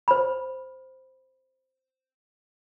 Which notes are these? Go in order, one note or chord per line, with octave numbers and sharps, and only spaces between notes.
C5 B5